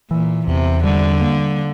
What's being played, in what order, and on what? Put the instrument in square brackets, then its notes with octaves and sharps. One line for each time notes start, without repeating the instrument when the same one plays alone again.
[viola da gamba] A#2 [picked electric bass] E3
[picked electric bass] E2 [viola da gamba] C3
[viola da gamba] D3 [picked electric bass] G3
[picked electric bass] A#3